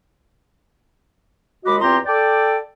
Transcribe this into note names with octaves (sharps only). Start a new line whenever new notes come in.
D#2 G#3 F#4 D#5 B5 D6
E2 C4 F4 G4 A#5 C6
A4 D5 G5